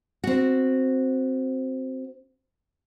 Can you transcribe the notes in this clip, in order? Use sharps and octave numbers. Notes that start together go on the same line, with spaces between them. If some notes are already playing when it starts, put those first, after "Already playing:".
C4 F#4